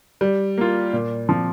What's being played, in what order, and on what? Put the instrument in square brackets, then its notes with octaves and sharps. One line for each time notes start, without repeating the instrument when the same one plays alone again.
[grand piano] G3
A#3 F4
A#2
F3 C4